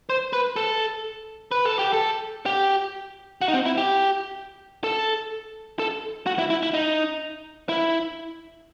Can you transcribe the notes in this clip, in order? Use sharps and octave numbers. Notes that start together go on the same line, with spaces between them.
C5
B4
A4
B4
A4
G4
A4
G4
F#4
D#4
C4
E4
G4
A4
A4
F#4
E4
E4
E4
D#4
E4